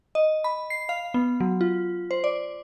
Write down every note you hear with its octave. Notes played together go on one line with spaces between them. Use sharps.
D#5
B5
C7
F5
B3
F#3
F4
C5
D5